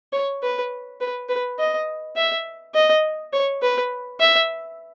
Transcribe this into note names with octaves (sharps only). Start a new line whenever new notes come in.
C#5
B4
B4
B4
D#5
E5
D#5
C#5
B4
E5